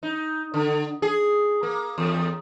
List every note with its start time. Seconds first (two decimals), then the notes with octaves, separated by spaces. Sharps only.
0.03 D#4
0.54 D3
1.02 G#4
1.63 A#3
1.98 E2